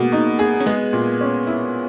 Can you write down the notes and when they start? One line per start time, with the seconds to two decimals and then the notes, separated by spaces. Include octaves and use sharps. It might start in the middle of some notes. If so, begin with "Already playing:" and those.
Already playing: B2 G#3 A#3
0.12 D#4
0.39 G#4
0.61 C#4
0.66 G#3 B3
0.93 A#2
1.21 C#4
1.47 E4